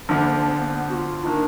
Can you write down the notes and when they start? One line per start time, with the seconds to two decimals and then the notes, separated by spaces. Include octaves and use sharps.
0.09 D2 D3 F3 A#3
0.37 D4
0.49 B3
0.60 A#3
0.71 B3
0.90 F#4
0.95 F4
1.24 D#3 A#3 D4